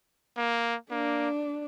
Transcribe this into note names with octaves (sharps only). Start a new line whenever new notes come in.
A#3
A#3 D4